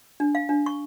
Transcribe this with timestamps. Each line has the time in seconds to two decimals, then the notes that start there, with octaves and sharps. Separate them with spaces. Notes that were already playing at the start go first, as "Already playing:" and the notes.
0.20 D4
0.35 F5
0.49 D4
0.66 C#6